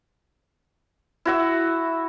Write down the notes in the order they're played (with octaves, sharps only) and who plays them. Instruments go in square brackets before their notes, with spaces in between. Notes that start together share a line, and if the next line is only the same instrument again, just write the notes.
[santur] E4 F#4 E5